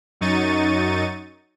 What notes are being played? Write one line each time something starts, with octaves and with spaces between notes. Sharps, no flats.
F#2 F#3 D#4 C#6 A6 D#7